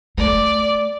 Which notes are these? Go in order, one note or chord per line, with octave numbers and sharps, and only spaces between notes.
A3 D5